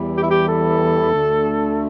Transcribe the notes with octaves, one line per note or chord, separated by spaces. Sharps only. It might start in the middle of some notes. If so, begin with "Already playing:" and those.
Already playing: E2 E3 G3
G4
E4
G4
A4
D2 D3 A3